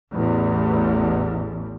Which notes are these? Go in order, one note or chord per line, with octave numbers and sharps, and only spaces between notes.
A1 E2